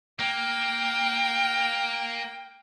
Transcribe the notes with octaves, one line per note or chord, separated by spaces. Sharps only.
A#3 G5